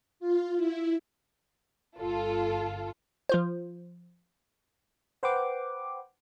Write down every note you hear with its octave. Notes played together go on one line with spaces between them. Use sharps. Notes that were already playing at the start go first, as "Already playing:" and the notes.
F4
E4
G1 F4 A4
F3 F4 C5
B4 C5 F#5 G5 C6 D6